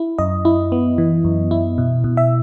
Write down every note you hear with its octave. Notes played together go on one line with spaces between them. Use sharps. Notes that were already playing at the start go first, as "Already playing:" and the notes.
Already playing: E4
F#2 D#5
E4
B3
E3
F#2
E4
B2
B2
E5